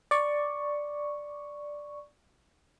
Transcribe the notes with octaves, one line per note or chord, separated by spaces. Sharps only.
D5 C#6